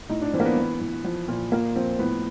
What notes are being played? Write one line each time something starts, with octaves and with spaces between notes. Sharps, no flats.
A2 D#4
D4
E3 C4
A#3
B3
E3
E3
F3
A#2
A#2 A#3
F3 C4
A2 B3